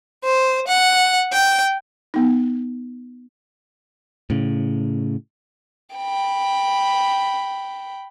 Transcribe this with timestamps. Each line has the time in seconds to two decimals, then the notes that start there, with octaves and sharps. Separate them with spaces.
0.24 C5
0.68 F#5
1.33 G5
2.14 B3 D#4
4.30 A2 C#3
5.96 G5 B5